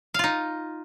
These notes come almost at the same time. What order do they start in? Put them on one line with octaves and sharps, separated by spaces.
F5 F4 D#4